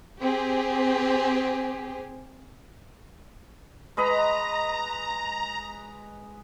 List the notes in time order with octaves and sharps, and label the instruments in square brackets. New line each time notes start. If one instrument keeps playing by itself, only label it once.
[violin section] C4 G4 G#4
[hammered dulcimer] G#3 B4 D#5 [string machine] A#5